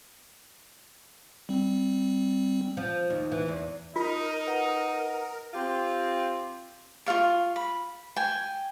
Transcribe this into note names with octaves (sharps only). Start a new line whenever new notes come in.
G3 C4
F3
D#2
E3
E2
D#4 F4 A#4
B4 F#5
C4 F4 G4
F4 A4 F5 C#6
B5
G5 G#5